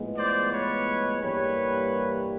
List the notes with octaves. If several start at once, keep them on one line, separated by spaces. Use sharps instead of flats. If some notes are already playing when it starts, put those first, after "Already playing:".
Already playing: A2 F3 G#3 B3
C5 D5
B4 C#5
G2 E3 G3 A#3 B4 C#5